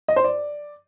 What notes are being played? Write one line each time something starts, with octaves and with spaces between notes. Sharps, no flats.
D#5
C5
D5